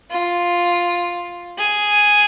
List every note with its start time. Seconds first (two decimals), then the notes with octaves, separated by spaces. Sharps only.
0.11 F4
1.58 G#4